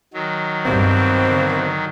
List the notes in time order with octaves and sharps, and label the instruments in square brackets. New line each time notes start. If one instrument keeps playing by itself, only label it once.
[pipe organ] D#3 F#3
[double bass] G2 [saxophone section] B2 A#3 C4
[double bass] D3